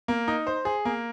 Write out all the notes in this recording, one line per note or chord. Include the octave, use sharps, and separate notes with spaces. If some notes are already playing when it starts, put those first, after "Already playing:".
A#3
D#4
C5
G#4
A#3